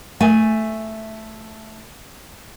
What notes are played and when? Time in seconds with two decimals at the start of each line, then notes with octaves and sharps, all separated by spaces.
0.20 A3 G#5